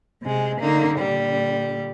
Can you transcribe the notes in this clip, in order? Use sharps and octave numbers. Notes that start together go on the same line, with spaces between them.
C3 G#3
D3 A#3 D#4
A#2 D3 G3